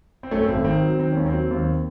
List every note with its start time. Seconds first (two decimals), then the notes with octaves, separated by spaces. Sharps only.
0.23 C4
0.31 F#2 A3 C#4
0.42 C4
0.48 G#1 A3
0.64 D#3 C4
0.82 F#3
0.99 D#3 C4
1.12 D#2 C#4
1.26 C4
1.33 F#3
1.51 D#2